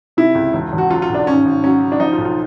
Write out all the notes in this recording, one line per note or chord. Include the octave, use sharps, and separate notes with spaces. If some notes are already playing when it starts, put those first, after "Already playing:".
C3 E4
C#2
E1
E1
F#4
F#3 F4
F4
B1
D4
G#1 C#4
G#1
F#3 C#4
C#3
D4
F3 D#4
F4
B1
F4